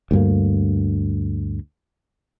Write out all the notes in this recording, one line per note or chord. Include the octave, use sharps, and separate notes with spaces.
D2 G2 A#3